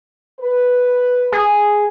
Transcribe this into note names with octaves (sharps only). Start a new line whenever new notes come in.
B4
G#4